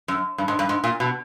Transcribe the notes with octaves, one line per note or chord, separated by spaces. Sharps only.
F#2
G2
G#2
G2
G#2
A#2
B2